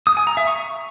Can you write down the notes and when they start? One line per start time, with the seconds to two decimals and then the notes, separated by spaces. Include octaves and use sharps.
0.07 D#6
0.17 G#5
0.27 A#5
0.37 E5
0.47 C#6